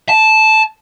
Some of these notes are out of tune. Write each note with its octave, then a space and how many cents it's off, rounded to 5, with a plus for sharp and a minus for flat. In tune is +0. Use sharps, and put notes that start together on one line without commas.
A5 -10